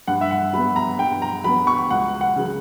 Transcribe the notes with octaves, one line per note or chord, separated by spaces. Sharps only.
G2 F#5
E5
F#5
F#3 B3 B5
A#5
G2 G5
A#5
F#3 B3 B5
C#6
C#2 F#5
F#5
C#3 F#3